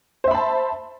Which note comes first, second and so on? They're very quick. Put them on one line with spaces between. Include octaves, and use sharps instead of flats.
C5 E5 B5 A5